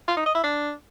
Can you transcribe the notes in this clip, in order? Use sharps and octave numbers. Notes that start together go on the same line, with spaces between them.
F4
D#4
D#5
E4
D4